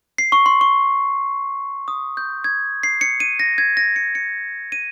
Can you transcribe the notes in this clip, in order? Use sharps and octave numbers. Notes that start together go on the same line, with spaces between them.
C7
C#6
C6
C#6
D#6
G6
G#6
C7
C#7
D#7
A#6
G#6
A#6
C#7
C#7
D#7